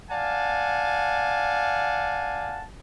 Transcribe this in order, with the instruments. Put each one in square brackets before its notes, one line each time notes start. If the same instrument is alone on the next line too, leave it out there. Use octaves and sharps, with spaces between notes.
[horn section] D5 F5 F#5 G#5 A5